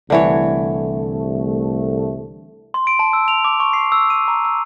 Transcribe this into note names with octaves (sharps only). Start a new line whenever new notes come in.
C2 D3 E3 A3 C#5
C6
D7
A5
E6
F7
D6
C#6
C7
E6
D#7
A#5
E6